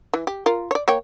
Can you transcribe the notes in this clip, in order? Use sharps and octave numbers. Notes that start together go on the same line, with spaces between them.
E3
G4
F4 A#4
C#5 D5
A#3 C#5 G5